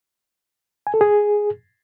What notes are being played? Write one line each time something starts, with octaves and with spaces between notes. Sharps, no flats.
G#5
A4
G#4